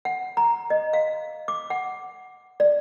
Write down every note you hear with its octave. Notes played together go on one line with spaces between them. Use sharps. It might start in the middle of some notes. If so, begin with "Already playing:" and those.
F#5
A#5
D#5
F5
D6
F#5
D5